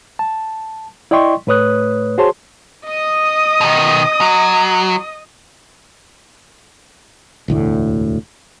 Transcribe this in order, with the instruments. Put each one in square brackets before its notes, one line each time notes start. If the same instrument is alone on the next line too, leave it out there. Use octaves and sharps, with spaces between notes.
[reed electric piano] A5
E4 D5 D#5 G5 C6 C#6
A2 A3 B4 C#5 D#6 F#6
F#4 G#4 C5 C#5 A5 C6
[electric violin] D#5 D#6
[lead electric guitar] B2 D#3
F#3
[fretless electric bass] E1 D2 A2